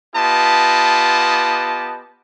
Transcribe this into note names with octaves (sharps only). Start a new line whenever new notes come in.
B3 F4 G4 D#5 A5